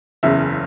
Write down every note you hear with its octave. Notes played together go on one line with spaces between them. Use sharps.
F#1 E2 C#3 E5